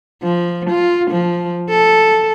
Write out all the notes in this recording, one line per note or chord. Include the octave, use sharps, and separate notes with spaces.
F3
F4
F3
A4